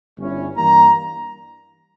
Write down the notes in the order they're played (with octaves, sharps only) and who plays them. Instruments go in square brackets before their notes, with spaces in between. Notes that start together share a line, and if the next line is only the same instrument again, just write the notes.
[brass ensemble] G1 G2 G3 C#4 E4
G2 E3 G3 A#3 A#5